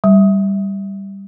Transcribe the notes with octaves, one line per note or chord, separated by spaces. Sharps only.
G3